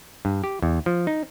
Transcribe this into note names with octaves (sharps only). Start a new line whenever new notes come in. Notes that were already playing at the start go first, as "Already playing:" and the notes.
G2
G4
E2
F3
D#4